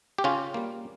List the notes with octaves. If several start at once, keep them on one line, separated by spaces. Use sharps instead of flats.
G4
C#3 C#4 F4
G3 A#3